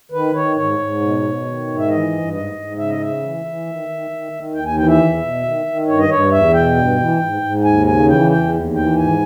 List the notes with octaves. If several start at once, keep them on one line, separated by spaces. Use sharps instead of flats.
D#3 B4
D#3 C#5
G#2 C#5
G#2
B2
B2
D#3
G#2
E5
E3 D#5
G2
G#2 D#5
G#2
C#3 E5
D#5
C#3 E5
E3
E3
D#3
D#3
D#3
D#3
D#2 G5
G#5
E3 G5
E5
E2
B2
D#3
D#3
G2 C#5
D#5
G2 C#5
E2 E5
B2 G5
G2
E3
G#2
G#2
D#2 G#5
C#3 G#5
E3 G5
E2 G5
D#2
E3 G5
G#2 G#5